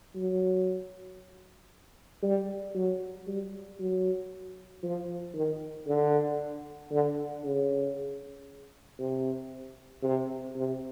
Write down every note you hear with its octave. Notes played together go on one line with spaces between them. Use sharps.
F#3
G3
F#3
G3
F#3
F3
D#3
D3
D3
C#3
C3
C3
C3